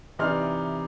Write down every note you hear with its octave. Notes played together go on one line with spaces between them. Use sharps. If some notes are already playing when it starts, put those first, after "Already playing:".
C3 E3 D#4 D5 C6 F6